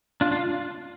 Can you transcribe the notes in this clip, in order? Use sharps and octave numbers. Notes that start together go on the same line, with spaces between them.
D4 F4
D4 F4